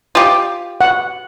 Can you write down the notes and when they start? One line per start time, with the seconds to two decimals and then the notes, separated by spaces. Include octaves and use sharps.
0.15 F4 G4
0.81 F#5